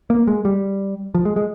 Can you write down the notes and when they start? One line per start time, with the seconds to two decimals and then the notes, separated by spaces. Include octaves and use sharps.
0.10 A#3
0.27 G#3
0.45 G3
1.15 F3
1.25 G#3
1.36 G#3